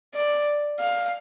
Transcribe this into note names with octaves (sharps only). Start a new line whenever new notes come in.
D5
F5